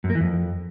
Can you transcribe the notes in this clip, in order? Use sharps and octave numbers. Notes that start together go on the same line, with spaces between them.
F#2
A#3
E3
F2